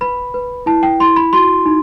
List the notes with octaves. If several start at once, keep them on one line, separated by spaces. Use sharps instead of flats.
B4 B5
B4
E4 A5
G5
E4 C6
B5
F#4 C6
D#4